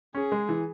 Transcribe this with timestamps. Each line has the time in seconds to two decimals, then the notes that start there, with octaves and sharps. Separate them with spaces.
0.15 C#4 G#4
0.32 G#3
0.49 E3